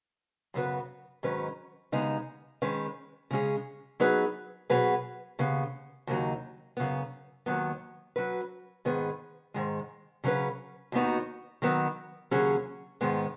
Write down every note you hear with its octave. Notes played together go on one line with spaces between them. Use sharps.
F#2 C#3 B3 F#4 B4
G#2 D#3 F#3 C#4 B4
D#2 C#3 G#3 B3 D#4
D#3 G#3 C#4 B4
C#3 G#3 C#4 G#4
F#3 B3 D#4 G#4 B4
B2 F#3 B3 G#4 B4
D#2 C#3 B3
D#2 C#3 F#3 D#4
F#2 C#3 B3
D#2 D#3 F#3 B3
F#3 C#4 F#4 B4
G#2 D#3 B3 G#4 B4
G#2 D#3 G#3
C#3 F#3 C#4 B4
D#2 D#3 B3 D#4 F#4
D#3 F#3 B3
D#2 C#3 F#3 C#4 G#4
G#2 D#3 G#3 B3